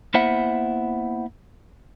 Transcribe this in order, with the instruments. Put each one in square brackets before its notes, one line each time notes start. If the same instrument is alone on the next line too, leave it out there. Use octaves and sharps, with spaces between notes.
[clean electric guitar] A#3 B3 E4 C5 E5 F#5